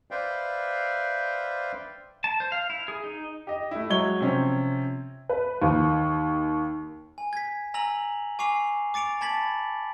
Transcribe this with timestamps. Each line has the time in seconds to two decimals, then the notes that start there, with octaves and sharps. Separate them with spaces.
0.11 B4 C5 D5 E5 F5 G5
2.24 A5
2.40 C5
2.52 F5
2.70 E4
2.88 G#4
3.04 D#4
3.47 G4 D#5
3.71 A3 E4
3.90 F#3 G#3 C#5 G#6 G7
4.21 C3 F3 C4 C#4
5.29 B4
5.62 D#2
7.18 G#5
7.33 G#6 B6
7.74 G#5 A#5 E6 A#6 F7 F#7
8.39 G#5 C#6 D6 E6 C7 F7
8.94 D6 A6 C#7 D7 F7
9.21 A5 B5 G#6 A6 B6 F#7